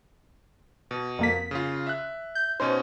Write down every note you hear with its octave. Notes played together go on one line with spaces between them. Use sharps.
B2
F2 A#3 B6
C#3 F4
E5 F#6
G6
B2 C#4 D#4 C5